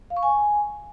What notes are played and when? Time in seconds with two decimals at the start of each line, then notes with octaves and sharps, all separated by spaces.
0.10 F5
0.17 C#6
0.23 G#5